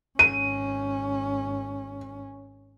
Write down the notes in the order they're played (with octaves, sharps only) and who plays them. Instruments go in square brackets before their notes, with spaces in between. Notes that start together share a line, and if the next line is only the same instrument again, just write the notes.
[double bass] G#1 C#4 [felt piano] D#7